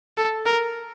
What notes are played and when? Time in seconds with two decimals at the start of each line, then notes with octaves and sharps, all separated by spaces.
0.18 A4
0.46 A#4